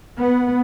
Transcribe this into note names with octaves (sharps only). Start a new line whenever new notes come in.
B3